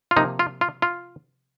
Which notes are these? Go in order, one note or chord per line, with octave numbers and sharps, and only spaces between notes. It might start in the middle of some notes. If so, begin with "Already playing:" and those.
F4
C3 F3 A#3 D#4
F4
F4
F4